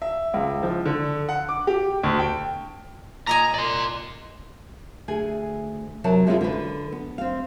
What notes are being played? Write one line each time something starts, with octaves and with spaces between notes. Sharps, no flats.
E5
C#2
F3
D3
F#5
D6
G4
D2
G5
A#2 D#5 G#5 A#5
D5 C6
D2 G#4 G#5
C3 F#3 A#4 C#5 A5
C3 G#3 C#4 D4 E4 F4
D3 B4
B3
C4 F5